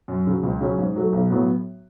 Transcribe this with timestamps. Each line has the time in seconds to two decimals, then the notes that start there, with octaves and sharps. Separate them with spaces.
0.08 F#2
0.27 C#3 F#3
0.43 C#2
0.61 C#3 F#3 C#4
0.78 G#2
0.96 F#3 A3
1.13 B1
1.30 A2 F#3 B3